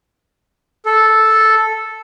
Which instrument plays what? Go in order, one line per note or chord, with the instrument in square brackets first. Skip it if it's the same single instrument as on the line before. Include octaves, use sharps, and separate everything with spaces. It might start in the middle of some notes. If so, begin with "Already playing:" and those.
[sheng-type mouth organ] A4